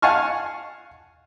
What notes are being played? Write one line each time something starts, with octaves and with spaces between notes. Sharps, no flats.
F5 F#5 G#5 A5 C#6 F6